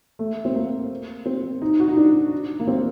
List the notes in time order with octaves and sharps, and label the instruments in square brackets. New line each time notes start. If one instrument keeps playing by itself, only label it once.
[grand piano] A3
C4
A#3
C4
D#4
F#4
D#4
D4
A#3
C4